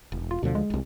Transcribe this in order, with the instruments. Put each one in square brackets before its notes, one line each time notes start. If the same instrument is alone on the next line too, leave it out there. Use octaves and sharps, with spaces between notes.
[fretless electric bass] E1
[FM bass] F4
[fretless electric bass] D2 D3 F3 [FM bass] B2
[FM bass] G#3
[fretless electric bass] E1 C2